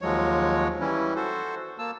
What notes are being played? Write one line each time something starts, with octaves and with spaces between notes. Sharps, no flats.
D#2 F3 F#3 G#3 C#5
E3 G3 C#4 E4
F#4 A4 C5
A#3 A5 E6